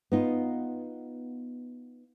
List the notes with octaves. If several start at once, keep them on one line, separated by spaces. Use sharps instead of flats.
B3 D#4 F4